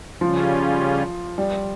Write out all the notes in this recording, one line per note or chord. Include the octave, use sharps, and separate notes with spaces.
C#3 F3 G3 C#4 F4
G3